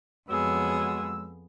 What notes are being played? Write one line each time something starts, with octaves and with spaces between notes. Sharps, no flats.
F2 F#3 G#3 B3 G#4 E6